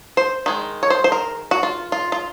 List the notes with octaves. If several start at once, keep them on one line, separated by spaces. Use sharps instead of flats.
C5
D#3 G#3
C#5
C5
C5
A#4
F#4
F4
F4
F4